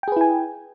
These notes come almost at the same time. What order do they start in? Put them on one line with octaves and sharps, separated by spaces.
G5 G#4 B4 E4 G#5